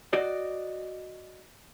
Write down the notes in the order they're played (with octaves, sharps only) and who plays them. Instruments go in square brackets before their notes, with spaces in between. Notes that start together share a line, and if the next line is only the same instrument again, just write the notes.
[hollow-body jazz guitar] F#4 D5 D#5